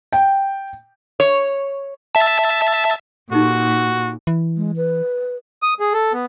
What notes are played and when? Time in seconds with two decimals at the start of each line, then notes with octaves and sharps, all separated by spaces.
0.12 G5
1.20 C#5
2.15 E5 A5
3.32 A#2 D#4 F#4 G4 A4
4.27 E3
4.57 G#3
4.76 B4
5.63 D#6
5.80 G#4
5.93 A4
6.13 B3